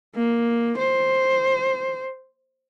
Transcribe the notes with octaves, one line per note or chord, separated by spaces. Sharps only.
A#3
C5